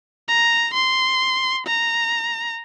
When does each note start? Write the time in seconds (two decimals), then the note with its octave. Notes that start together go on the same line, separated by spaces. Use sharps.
0.28 A#5
0.73 C6
1.66 A#5